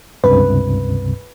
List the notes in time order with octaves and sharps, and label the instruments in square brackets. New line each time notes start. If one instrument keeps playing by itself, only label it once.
[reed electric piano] C#2 G2 C3 [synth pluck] B4